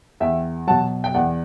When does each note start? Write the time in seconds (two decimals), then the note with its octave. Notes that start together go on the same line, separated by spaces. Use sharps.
0.20 E2 E5 G5
0.67 B2 F#3 F#5 A5
1.04 G5
1.14 E2 D5 F#5